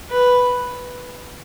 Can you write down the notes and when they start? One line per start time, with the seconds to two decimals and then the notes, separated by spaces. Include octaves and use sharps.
0.10 B4